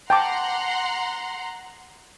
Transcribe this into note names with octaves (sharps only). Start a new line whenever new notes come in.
F#5 G5 A5 A#5 C6 D6